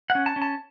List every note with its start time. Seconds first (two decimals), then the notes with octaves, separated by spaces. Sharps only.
0.10 F#5
0.15 C#4
0.26 A5
0.36 C#4
0.42 A5